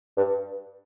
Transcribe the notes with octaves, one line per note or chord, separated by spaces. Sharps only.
G2